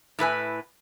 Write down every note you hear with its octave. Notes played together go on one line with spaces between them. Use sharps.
A2 E4 B4 G#5